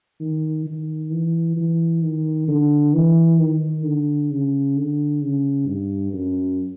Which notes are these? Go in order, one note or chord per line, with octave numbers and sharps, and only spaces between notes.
D#3
D#3
E3
E3
D#3
D3
E3
D#3
D3
C#3
D3
C#3
G2
F#2